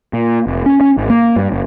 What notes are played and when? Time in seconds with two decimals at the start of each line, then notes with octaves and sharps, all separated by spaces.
0.13 A#2
0.47 F1
0.66 C#4
0.81 C#4
0.97 G#1
1.10 A#3
1.36 G2
1.52 F#1